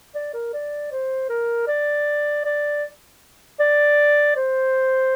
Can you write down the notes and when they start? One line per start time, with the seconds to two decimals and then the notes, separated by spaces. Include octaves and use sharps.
0.15 D5
0.33 A#4
0.54 D5
0.92 C5
1.29 A#4
1.68 D5
2.45 D5
3.60 D5
4.36 C5